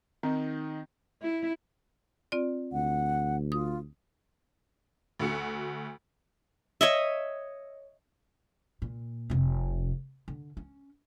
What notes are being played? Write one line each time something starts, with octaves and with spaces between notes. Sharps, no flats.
D#3 C4 D#4
E4
C4 F4 D5
D2 F#5
F4 D#6
D2 A3 F#4 C#7
C#5 D#5 E5
A#2
F1 C3
D3
C#4